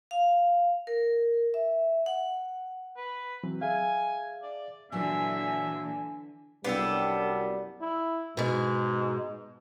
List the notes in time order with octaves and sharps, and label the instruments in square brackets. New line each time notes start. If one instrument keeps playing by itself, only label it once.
[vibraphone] F5
A#4
E5
F#5
[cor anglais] B4
[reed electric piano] E3 F#3 C4
[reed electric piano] G#4 E5 F5 [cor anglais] G#5
[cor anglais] D5
[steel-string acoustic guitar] A#2 F#3 D4 [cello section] D3 E3 [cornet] E5 [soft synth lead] G#5
[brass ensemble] C2 F#2 G3 [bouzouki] B3 [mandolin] D4 G4 A4
[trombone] E4
[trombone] G#2 [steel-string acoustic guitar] B2 G#3